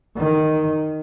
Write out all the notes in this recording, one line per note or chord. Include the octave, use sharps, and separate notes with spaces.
D#3